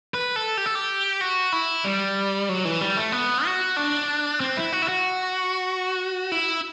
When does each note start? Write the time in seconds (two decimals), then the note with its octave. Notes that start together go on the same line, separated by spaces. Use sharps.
0.14 B4
0.36 A4
0.57 G4
0.66 A4
0.75 G4
1.21 F#4
1.52 E4
1.85 G3
2.49 F#3
2.65 E3
2.81 G3
2.97 A3
3.12 B3
3.45 F#4
3.77 D4
4.40 C4
4.57 E4
4.72 F#4
4.82 E4
4.88 F#4
6.32 E4